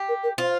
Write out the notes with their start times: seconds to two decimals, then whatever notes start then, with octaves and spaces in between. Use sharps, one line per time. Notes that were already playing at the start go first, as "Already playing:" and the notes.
Already playing: G4
0.08 A#4
0.23 A#4
0.38 F4 C5